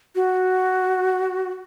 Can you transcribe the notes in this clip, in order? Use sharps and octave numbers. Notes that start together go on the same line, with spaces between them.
F#4